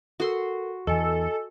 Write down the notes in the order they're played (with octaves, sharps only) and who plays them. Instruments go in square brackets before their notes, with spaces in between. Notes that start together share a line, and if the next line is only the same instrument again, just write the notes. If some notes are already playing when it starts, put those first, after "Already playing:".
[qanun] F#4 C6 [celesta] A4 A#4
[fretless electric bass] E2 E3 [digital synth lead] A4 [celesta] D#5 G#5